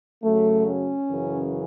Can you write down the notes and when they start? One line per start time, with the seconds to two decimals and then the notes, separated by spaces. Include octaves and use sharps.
0.23 F#2 C#3 F#3 A3
0.67 C#4
1.10 F#2 C#3 E3